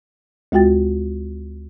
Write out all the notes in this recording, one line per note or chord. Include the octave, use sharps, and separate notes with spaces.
D2 G#3 F4 F#4 G5 A6